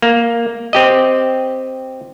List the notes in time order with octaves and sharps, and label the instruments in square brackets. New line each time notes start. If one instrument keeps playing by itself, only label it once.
[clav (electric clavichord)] A#3
C4 G4 D#5